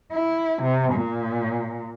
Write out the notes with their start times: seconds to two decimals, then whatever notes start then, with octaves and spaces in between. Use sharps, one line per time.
0.12 E4
0.62 C3
0.93 A#2